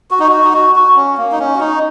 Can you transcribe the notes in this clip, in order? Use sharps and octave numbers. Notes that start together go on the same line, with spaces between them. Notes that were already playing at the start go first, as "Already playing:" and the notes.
F#4
D#4
F#4
D#4
F#4
F#4
C#4
A#3
D#4
C#4
F#4
D#4